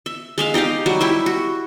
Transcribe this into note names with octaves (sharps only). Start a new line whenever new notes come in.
E5
G#3 E5 F5
D#4 G4 D#5 F5
F#3 G3
E4 G4 E5
F#4